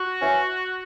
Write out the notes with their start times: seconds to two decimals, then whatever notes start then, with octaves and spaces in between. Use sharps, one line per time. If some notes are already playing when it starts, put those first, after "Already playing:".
Already playing: F#4
0.20 E3 C#4